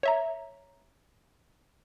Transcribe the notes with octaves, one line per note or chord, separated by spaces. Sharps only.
C#5 E5 A#5